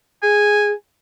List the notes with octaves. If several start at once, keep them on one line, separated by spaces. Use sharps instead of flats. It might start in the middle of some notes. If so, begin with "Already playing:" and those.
G#4 G#5